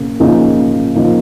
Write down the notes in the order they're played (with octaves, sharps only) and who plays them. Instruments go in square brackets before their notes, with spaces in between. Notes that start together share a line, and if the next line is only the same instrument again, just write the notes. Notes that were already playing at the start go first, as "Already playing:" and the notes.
Already playing: [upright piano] C#3 A#3
C#3 F3 A#3 D#4
C#3 F3 A#3 D#4